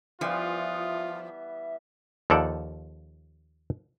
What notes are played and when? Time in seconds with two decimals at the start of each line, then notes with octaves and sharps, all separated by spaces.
0.21 E3 F3 G3 B3 F4 E5
2.30 D#2 F3 A4 D5 F#5